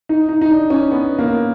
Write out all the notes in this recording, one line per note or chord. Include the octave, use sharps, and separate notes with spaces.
D#4
D#4
D#4
D4
C#4
B3
A#3